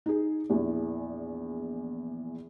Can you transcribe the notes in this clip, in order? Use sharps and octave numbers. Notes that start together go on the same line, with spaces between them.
D#4 G#4
A#1 E2 E3